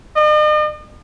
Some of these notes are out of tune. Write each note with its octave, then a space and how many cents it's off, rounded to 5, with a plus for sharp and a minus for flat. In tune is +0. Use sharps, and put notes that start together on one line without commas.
D#5 -45